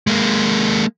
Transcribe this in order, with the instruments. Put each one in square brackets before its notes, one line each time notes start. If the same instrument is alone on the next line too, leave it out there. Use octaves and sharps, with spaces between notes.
[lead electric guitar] G#3 A#3